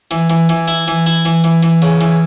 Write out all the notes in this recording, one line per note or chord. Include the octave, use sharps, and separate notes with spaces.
E3
E3
E3
E4
E3
E4
E3
E3
E3
C#3
E3